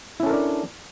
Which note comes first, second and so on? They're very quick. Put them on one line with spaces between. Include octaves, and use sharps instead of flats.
E4 C#4 A4 A#4 D4